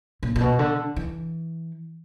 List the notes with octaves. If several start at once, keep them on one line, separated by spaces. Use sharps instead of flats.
A#2
A#2
B2
D3
E3